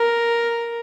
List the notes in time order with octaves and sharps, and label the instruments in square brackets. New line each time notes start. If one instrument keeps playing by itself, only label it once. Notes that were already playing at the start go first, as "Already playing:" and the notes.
Already playing: [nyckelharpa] A#4